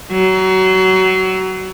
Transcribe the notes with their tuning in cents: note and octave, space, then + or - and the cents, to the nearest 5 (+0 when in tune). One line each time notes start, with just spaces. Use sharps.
F#3 +25